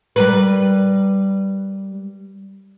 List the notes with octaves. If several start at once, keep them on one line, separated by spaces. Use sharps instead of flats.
G3 A#4 B4